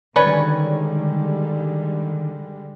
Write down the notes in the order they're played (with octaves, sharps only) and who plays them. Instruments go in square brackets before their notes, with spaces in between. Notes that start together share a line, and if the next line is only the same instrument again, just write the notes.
[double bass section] D3 G3 G#3 [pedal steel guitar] D#3 [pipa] C#4 B4 C#5 [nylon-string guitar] D5